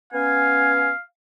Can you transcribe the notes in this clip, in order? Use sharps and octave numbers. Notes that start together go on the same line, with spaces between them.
B3 C#4 F5 G#5